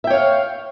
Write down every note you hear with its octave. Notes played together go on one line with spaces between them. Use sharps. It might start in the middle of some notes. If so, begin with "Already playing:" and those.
C#5 E5 F5 G5